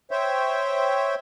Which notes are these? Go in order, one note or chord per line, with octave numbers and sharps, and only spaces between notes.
C5 C#5 E5 G5